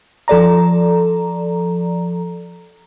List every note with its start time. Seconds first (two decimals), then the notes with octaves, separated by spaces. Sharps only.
0.28 F3 A4 D5 A#5